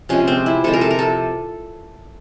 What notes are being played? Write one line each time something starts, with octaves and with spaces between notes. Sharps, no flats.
C3 F3 G#3 C#4
C4
E4
C3 F3 G#3 A4
A#4
A4
A#4
A4